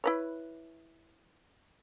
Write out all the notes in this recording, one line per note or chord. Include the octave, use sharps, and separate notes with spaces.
E4 B4 C#5